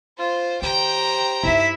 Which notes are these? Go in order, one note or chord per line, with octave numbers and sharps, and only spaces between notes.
F4 C5 C6
D#3 G4 C5 G5 A#5
G2 D#4 E4 E5